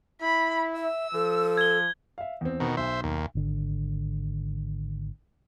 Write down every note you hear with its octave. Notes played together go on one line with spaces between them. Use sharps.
E4 B5
E5 E6
F3 A4
G#6 G7
E5 F5
E2 C4
B2 D#3
B1 C5 E5
D#2
G#1 D3